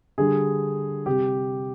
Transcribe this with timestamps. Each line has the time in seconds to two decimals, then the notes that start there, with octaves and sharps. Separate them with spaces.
0.18 D3 G3 G#4
1.06 C3 G3 G4